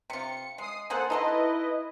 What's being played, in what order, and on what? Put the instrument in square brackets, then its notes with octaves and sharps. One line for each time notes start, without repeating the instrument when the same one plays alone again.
[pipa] C3 F4 [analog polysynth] C#7
[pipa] G#3 [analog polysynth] D#6 C7
[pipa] A#3 G#4 C5 [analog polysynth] A4 F#5
[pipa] D#4 A4 C6 [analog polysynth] E4 B4 D#5